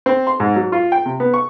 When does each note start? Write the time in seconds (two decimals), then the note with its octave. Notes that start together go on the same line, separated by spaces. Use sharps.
0.06 C4
0.27 C6
0.40 G#2
0.56 F#3
0.72 F4
0.92 G5
1.05 C3
1.20 B3
1.34 C#6